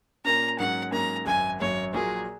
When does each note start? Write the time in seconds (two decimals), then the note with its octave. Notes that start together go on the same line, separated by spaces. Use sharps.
0.25 A#2 A#3 C#4 A#5
0.59 G#2 F#3 A#3 C#4 F#5
0.92 G#2 F#3 A#3 C#4 A#5
1.26 G#1 F#2 F#3 G#5
1.60 G#1 F#2 F#3 C#5
1.93 A#1 A#2 F#3 A#3 F#4 G#4